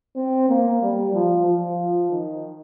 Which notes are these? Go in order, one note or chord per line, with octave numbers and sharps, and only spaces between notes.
C4
A#3
G3
F3
F3
D#3